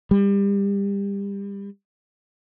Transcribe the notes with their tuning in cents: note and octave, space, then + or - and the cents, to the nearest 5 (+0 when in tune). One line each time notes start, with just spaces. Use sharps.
G3 +30